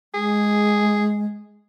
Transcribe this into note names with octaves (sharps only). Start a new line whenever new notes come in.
G#3 G#4